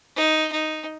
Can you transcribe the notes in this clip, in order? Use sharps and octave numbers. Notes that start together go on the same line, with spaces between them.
D#4
D#4